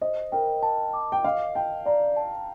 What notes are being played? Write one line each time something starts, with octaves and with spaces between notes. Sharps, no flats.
C5 D#5
A#4 G5
A5
D6
G5
D#5 F5
G5 A5
D5 A#5
A5